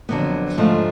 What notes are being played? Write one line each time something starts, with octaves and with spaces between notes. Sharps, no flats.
F2 D3 F#3 B3
G#2 F3 A3 D4 F4